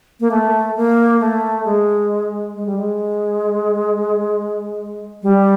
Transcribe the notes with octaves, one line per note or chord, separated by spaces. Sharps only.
A#3
A3
A#3
A3
G#3
G#3
G3
G#3
G3